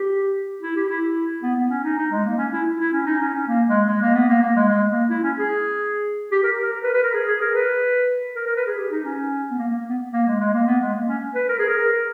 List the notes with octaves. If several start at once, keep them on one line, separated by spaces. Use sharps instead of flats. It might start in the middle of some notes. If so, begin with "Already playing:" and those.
Already playing: G4
E4
G4
E4
B3
B3
C#4
D#4
D#4
G#3
A#3
C#4
E4
E4
E4
C#4
D#4
C#4
C#4
A#3
G#3
G#3
A#3
B3
A#3
A#3
G#3
G#3
A#3
E4
C#4
G#4
G4
A#4
A#4
A#4
B4
B4
A#4
G#4
G#4
A#4
B4
A#4
A#4
B4
G#4
G4
D#4
C#4
B3
A#3
A#3
B3
A#3
G#3
G#3
A#3
B3
G#3
A#3
C#4
B4
A#4
G#4
A#4